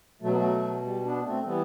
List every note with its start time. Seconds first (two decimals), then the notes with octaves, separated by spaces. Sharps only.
0.22 B2 F#3 A3
0.29 B3
0.36 F#3 A3
0.83 G3
1.05 B3 D4
1.25 A3 C4
1.45 E3 G3 B3